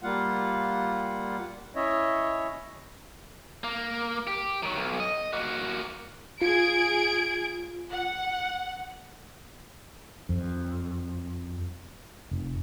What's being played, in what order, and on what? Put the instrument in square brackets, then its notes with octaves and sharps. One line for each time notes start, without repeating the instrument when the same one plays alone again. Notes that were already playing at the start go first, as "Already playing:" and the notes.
[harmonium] G3 A#3 F4 F5 F#5
C#4 E4 C#5 D#5 E5
[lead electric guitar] A#3
G4
D#3 F#3
B1
D#5
A#3 F#4
[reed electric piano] F4 [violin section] G#4 G#6 D7
[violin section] F#5
[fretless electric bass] F2
F1